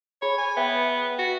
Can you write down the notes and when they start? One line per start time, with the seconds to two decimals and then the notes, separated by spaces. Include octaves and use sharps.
0.22 G#4 C#5 B5
0.38 G#5
0.57 B3 B4 E5 G5
1.19 F#4